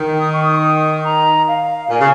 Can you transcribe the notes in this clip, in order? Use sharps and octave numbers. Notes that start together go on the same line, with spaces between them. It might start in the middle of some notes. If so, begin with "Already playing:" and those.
Already playing: D#3
D#6
C#6
D#6
A#5
F5
A#2 G#5
C#3